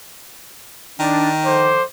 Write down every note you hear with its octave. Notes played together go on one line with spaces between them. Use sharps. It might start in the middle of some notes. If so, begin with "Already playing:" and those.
D#3 D4
D3 F3 C5 D6